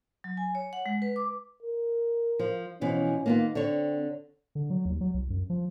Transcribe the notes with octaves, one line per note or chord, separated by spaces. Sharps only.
F#3
G#5
C#5
F#5
G#3
B4
D6
A#4
F3
B2 E3 F3 C#4
D#3 A#3 B3 F4
D3 C4 C#5
D3
F#3
D#2
F#3
C2
F#2
F3